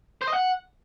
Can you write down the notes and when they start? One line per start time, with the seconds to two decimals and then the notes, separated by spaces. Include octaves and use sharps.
0.22 C5
0.28 D#5
0.34 F#5